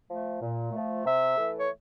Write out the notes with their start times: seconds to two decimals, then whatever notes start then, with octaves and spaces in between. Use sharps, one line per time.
0.09 F3 A3
0.40 A#2
0.72 A3
0.77 F3
1.04 C3 E5
1.37 E3 A3
1.57 C#5